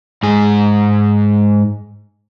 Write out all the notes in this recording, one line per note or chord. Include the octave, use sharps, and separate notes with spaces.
G#2 G#4